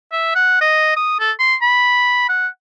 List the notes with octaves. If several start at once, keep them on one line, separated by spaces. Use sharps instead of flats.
E5
F#5
D#5
D#6
A4
C6
B5
F#5